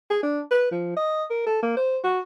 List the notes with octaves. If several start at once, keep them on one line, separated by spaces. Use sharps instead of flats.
G#4
D4
B4
F3
D#5
A#4
A4
A#3
C5
F#4